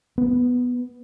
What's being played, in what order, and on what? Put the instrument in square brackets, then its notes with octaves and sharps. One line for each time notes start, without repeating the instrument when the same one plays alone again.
[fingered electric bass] B3